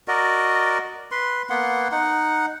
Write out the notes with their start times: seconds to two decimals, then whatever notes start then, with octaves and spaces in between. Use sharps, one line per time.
0.08 F#4 A#4 D5 D#5
1.12 B4 C6
1.50 A#3 B3 F#5 C6
1.92 D#4 F#5